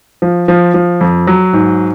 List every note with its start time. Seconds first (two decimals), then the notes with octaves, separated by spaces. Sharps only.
0.22 F3
0.48 F3
0.74 F3
1.01 F2
1.27 F#3
1.53 G#2